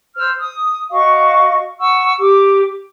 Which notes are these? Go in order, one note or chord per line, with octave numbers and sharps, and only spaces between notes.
C5 E6 F6
D#6
F#4 D#5 F5 C#6
F#5 C#6 E6
G4 D6